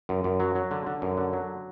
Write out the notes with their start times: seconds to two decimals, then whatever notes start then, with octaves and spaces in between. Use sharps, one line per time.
0.09 F#2
0.24 F#2
0.40 F#3
0.55 F#3
0.71 D3
0.87 D3
1.02 F#2
1.17 D3
1.33 F#3